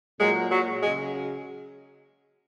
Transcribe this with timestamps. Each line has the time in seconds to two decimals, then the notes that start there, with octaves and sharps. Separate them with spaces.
0.18 A#2 F#3 G#3
0.50 F#3
0.81 C#3 F#3 G#3